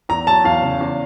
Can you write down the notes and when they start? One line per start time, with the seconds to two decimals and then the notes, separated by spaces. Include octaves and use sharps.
0.09 E2 A#5
0.27 F#3 A5
0.44 E2 F5
0.62 C#3
0.81 E2